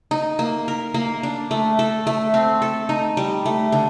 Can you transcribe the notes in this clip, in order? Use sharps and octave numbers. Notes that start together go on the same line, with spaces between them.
D#4
A#3
A#4
A#3
D4
A3
A4
A3
C4
A4
D#4
G3
A3
D3